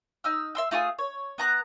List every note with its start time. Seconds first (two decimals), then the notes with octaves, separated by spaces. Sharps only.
0.24 D#4 E6 F6
0.55 E5 C6 E6
0.71 A3 F4 F#4 G#4
0.99 C#5
1.38 B3 A#5 F#6